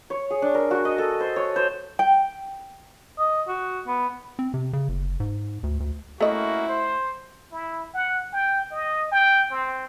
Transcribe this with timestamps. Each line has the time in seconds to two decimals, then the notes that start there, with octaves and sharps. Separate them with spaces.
0.10 C#5
0.30 G#4
0.42 D4
0.55 A#4
0.71 F#4
0.85 D#5
0.98 A4
1.20 C5
1.36 C#5
1.56 C5
1.99 G5
3.18 D#5
3.48 F#4
3.87 B3
4.39 C4
4.54 C3
4.73 C#3
4.89 F#1
5.20 G#2
5.63 D2
5.80 D2
6.21 A3 A#3 C#4 E4 F#4 D#5
6.67 C5
7.52 E4
7.94 F#5
8.33 G5
8.71 D#5
9.11 G5
9.50 C4